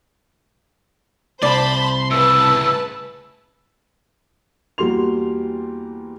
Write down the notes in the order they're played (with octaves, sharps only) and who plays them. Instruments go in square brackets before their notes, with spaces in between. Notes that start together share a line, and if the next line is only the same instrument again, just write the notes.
[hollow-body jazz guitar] C2 D5 [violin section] C5 A5 B5 [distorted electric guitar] C6
[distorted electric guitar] A2 C#3 [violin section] B4 A5 [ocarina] E6
[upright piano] E2 G3 A#3 F#4 C6 F7